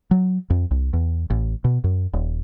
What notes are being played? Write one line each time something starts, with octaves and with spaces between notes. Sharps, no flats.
F#3
F2
C2
E2
A1
B2
F#2
D#1